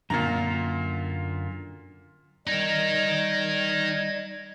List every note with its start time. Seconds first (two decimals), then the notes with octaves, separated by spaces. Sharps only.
0.10 F#2 A#2 D3 F4 A#5
2.47 G3 D#4 A#4 D#5 G#6